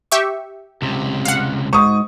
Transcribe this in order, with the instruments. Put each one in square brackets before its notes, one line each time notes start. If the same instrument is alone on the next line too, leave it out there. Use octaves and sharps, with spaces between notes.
[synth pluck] G4 E5 C#6
[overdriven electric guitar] C#2 C3
[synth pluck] F5 F#5
[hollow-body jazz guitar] G#2 [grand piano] C#6 D#6